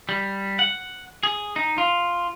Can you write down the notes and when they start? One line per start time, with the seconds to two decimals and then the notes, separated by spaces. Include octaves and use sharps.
0.09 G3
0.59 F#5
1.23 G#4
1.56 D#4
1.78 F4